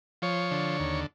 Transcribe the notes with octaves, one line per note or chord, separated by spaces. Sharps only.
F3 C#5
D3
D#2